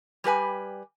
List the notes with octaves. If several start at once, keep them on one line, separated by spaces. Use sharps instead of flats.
G3 G4 B4 G#5